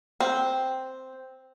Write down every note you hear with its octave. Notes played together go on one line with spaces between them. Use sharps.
C4